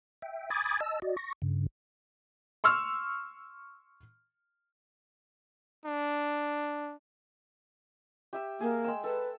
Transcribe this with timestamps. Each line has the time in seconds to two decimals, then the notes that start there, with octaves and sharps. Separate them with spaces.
0.22 E5 G5
0.50 G#5 B5 D6 D#6 G#6 A6
0.80 D#5 A5 E6
1.02 F#4 D5 D#5
1.17 C#6 A#6
1.42 G2 C#3
2.64 C6 C#6 E6 F6
5.85 D4
8.33 G4 E5 E6
8.61 A#3 G#4
8.84 G#3 G5 E6
9.04 A4 B4